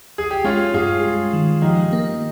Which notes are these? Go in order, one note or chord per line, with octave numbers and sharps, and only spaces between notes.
G#4
G4
G#3 C#4 F4
G2 F4 G#4
G2
D#3
F3 D#4 G4
A#3